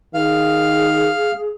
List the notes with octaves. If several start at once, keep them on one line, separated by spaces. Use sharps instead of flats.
D#3 G#4 F5